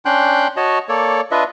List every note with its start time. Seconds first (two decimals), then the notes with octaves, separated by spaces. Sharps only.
0.05 C#4 D4 G5 C6 F#6 G6
0.57 F#4 C#5 D#5 A5
0.89 A#3 A4 C#5 D5
1.31 D4 F4 B4 D#5 E5